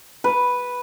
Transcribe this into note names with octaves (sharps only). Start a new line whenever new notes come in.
B4